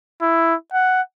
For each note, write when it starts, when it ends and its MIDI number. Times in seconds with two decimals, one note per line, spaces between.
0.22 0.55 64
0.73 1.01 78